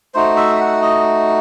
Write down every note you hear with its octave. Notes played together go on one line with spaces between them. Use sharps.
A3 D#4 F#4 C5
E5
E5
F#5
D#5